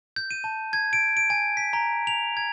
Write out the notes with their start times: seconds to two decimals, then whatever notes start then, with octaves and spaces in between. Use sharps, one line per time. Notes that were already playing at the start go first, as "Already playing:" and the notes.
0.16 G6
0.31 D#7
0.44 A5
0.73 G#6
0.93 D7
1.17 D7
1.30 G#5
1.57 B6
1.73 A#5
2.07 F7
2.37 G#6